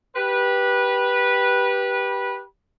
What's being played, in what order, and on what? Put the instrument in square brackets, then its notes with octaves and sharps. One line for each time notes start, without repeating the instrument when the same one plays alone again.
[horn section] G4 B4